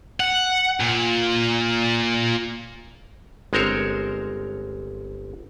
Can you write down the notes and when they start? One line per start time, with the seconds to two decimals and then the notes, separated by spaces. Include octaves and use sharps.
0.20 F#5
0.80 A#2
3.53 G1 G#3 C4 A#4 C5 C#5